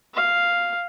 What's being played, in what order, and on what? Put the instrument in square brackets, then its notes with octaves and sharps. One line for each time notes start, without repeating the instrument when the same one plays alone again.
[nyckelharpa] F5